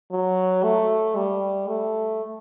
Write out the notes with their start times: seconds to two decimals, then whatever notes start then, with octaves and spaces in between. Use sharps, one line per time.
0.12 F#3
0.63 A3
1.16 G3
1.68 A3